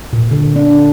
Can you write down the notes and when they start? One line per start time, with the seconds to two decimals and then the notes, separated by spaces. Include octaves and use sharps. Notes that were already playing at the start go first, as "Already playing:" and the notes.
0.13 A#2
0.31 D3
0.56 D4